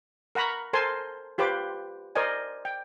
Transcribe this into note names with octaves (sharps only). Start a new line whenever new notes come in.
A#4 F#5 A#5 B5 C#6
A4 A#4 C5 G#5 A5 C6
F4 G4 B4 C5 D6
A#4 C5 D5 D#5 G#5
G5